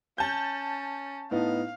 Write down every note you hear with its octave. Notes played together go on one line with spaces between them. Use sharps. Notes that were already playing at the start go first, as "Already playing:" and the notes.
C#4 A5 G6
A2 B3 D#4 F5